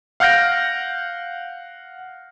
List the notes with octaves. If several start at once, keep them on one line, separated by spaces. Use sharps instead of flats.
F5 F#5 F6 G6 A#6 D7